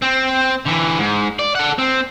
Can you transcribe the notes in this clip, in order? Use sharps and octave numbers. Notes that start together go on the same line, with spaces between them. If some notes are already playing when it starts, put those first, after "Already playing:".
C4
D3 E3
G#2
D5
A4 F#5
C4